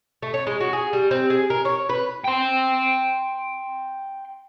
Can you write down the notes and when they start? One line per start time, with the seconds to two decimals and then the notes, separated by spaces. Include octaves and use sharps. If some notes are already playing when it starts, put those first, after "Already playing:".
0.22 A3
0.34 C#5
0.47 G#3
0.61 F#4
0.73 G#4
0.93 G3
1.11 C4
1.30 G#4
1.50 A#4
1.65 C#5
1.89 B4
2.25 G5 C6